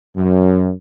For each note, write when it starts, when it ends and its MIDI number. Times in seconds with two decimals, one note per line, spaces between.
0.16 0.71 42